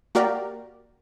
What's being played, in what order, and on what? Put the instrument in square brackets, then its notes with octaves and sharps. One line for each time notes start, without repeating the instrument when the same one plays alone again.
[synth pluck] A#3 F#4 G4 A#4 D5